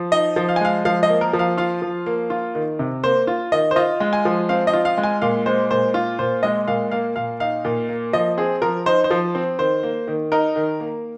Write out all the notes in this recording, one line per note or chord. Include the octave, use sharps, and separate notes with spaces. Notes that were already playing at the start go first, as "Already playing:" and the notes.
Already playing: F3
D#4 D#5
F3
F5
G#5
G#3 F5
F3 F5
D#5
A#3
A#4
F3
F5
F4 F5
F3
A#3
F4
D#3
C3
A#3 C5
F4
D#3 D#5
C5
F4 D#5
G#3
G#5
F3
C4 F5
D#5
F4
F5
G#3
G#5
A#2 F5
G#3 C5
A#2 C5
F4
A#2 C5
G#3 D#5
A#2 F5
A#3 F5
A#2 F5
D#4 F5
A#2
A#3
F3 D#5
C4 G#4
F3 A#4
D#4 C5
C5
F3
C4
D#3 C5
A#3
D#3
D#4 A#4
D#3
A#3